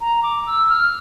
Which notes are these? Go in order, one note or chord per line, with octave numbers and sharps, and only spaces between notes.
A#5
D6
E6
F6